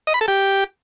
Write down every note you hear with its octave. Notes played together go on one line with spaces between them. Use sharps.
D#5
B5
A4
G4